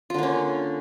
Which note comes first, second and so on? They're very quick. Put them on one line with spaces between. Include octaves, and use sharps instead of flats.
F4 D3 A#3 C#4